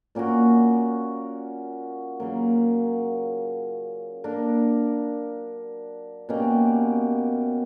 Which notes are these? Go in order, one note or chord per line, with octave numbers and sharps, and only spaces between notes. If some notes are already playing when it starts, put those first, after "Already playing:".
A#2 A#3 C#4 F#4
C#3 F#3 A#3
A#3 D4 A#4
B2 A#3 C#4 G4